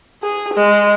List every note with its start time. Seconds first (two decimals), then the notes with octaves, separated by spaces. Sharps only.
0.23 G#4
0.54 G#3